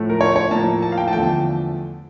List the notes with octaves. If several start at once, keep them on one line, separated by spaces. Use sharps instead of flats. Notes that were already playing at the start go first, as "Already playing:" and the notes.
Already playing: A2 F3 A3
A#4
C#5
C#5
A2 F3 A#3 A5
A5
F5
G5
A5
E2 D3 F3 A3 G5
A5